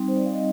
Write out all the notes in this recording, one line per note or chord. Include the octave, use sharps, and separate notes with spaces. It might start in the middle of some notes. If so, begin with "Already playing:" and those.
Already playing: G3 C4 D#4
C5
D5
F5
D#5